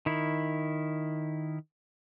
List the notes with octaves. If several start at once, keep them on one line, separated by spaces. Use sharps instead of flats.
D#3 E4